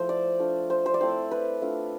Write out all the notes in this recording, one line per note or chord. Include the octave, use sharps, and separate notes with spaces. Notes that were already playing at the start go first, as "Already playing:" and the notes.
Already playing: F3 A3 E4 C5
D5
A3 D4 F4
C5
C5
D5
A3 C4 E4 C5
B4
A3 D4 F4